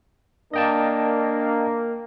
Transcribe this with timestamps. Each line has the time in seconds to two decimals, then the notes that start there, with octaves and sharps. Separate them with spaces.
0.54 A#3 D4 D#5 G5 A5